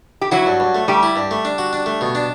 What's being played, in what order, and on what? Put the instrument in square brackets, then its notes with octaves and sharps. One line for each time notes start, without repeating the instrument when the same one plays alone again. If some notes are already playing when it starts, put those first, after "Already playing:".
[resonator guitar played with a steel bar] G4
[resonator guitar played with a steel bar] F#3 F#4 [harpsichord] E4
[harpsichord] G2
G2
A3
[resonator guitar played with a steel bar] G3 G4 [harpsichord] A3
[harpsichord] E4
G2
A3
D4
F#4
D4
A3
B2
D4